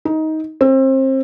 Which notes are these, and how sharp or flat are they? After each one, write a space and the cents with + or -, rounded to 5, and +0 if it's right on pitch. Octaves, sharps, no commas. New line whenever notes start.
D#4 +15
C4 +30